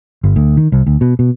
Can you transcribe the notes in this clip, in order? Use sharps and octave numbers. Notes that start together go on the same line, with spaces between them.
G1
D2
D#3
C2
D2
B2
B2